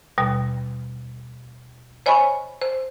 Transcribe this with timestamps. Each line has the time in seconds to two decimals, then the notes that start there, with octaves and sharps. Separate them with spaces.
0.18 D#2 B2 G3
2.06 C5 C#5 D#5 G#5 B5 C#6
2.62 C5